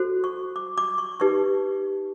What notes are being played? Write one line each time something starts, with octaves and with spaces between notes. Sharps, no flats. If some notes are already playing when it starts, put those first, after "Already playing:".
Already playing: F#4 A4 C5
C#6
D6
D6
C#6
D#4 G4 B4 C#6